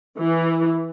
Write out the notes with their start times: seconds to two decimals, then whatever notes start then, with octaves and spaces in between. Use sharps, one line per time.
0.19 E3